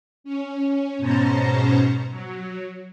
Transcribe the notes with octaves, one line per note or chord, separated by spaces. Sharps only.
C#4
G#2 B2 C#4 C5 A5 A#5
F#3